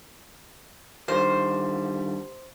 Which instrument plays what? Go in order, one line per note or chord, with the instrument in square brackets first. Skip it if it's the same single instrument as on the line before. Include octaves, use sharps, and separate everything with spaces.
[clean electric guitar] D3 D#3 G3 [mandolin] C5